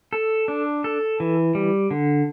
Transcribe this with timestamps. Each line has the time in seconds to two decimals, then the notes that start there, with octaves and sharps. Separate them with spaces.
0.13 A4
0.48 D4
0.84 A4
1.20 E3
1.55 G3
1.91 D3